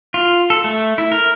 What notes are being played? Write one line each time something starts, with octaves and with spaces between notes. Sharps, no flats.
F4
A4
A3
E4
A#4